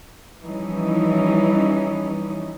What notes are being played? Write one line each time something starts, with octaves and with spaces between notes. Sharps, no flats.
E3 F3 G3 C#4 D#4